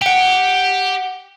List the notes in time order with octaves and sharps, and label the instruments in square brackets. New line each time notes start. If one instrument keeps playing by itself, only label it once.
[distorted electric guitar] G4 [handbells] F#5 G5